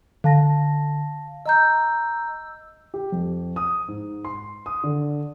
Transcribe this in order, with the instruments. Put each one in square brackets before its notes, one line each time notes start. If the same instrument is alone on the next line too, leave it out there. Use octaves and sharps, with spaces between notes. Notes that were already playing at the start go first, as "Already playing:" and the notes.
[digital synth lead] D3 [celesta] F5 A5 A#6
[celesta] D#5 A#5 G6 [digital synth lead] E6
[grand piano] G4
F2
D#6
G#2
C6
D#6
D3